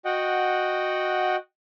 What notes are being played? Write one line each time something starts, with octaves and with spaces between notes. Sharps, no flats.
F#4 D#5 F#5 G5